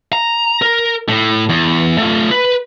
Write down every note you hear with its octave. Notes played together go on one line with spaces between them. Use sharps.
A#5
A#4
A2
E2
A3 F4
B4